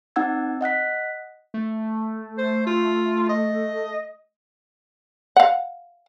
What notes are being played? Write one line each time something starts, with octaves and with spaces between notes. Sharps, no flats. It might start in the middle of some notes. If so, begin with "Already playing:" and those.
C4 D#4 F#5 E6 G#6
D#5 F#5 F#6 B6
A3
C5
F4
D#5
F5 F#5